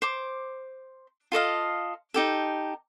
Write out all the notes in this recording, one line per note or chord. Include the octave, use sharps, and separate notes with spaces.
C5 D6
F4 A4 D#5 F5
D#4 G4 A4